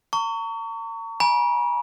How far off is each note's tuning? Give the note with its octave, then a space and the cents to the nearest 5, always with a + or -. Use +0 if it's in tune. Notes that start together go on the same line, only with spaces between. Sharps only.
A#5 -40 C#6 +25
G#5 +0 B5 -45